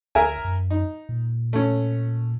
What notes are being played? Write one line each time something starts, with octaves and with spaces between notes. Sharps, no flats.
D2 A#4 E5 G#5
F#2
D#4
A#2
A3 C#4